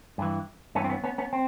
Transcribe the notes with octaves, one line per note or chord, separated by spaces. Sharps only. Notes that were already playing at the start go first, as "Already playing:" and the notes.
G2 E3
G2 E3 B3 C#4
C4
B3 C#4
B3 C#4
B3 C#4
C4